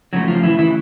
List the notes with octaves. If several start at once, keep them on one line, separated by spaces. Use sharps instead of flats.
C#3 F3 F#3 A3 F#4
F3 F4
E3 E4
E3 E4